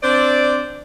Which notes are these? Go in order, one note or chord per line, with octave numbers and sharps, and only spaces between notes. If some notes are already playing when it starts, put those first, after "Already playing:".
C4 D4 C5 D5